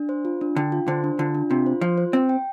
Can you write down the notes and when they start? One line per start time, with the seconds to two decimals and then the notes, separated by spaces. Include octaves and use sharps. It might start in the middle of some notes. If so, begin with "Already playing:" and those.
Already playing: D4
0.09 C5
0.25 F4
0.41 D4
0.56 D3 G5
0.72 F4
0.88 D3 C5
1.04 D4
1.19 D3 F4
1.35 D4
1.50 C3 F4
1.66 C5
1.81 F3 F4
1.98 C5
2.13 C4 G5
2.29 G5